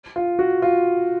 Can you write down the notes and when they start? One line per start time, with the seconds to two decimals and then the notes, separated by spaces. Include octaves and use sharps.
0.16 F4
0.39 F#4
0.62 F4